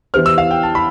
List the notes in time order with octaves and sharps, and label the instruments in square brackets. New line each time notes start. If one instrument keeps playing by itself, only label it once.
[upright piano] E3 B3 E4 G4 C5 [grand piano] F6
[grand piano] E6
F5
G5
A5
B5